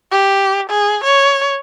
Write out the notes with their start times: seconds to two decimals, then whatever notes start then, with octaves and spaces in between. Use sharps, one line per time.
0.11 G4
0.70 G#4
1.04 C#5